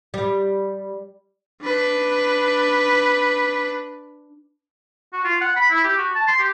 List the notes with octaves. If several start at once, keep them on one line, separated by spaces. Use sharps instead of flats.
G3
D4 B4
F#4
F4
F#5
B5
E4
G4
F#4
A5
C6
G4